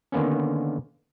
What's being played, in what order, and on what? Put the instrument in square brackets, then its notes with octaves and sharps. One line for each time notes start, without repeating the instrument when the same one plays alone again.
[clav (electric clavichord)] D3 D#3 A#3 B3 C#4